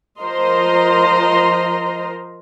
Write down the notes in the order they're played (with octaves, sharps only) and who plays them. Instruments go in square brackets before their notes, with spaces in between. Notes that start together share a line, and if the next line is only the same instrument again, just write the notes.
[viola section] F3 A#4 C5 D#5 A#5 C6